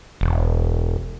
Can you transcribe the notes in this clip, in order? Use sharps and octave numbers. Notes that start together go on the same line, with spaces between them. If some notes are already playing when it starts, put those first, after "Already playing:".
E1